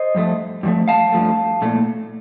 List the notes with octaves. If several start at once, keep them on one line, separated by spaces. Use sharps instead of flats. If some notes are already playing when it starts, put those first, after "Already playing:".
Already playing: C5 D#5
G2 F3 A3
G2 F3 A3
F5 A5
G2 F3 A3
A#2 A3